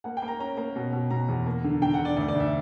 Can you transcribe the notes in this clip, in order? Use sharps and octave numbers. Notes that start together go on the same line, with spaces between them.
A#3 F#5
G5
A#3
A#5
C#4 A#5
A#3
B2
B2
B2 A#5
E2
A#3
D3
D3 G5
F#5
D3
D5
D2 D5
D5
D2
E5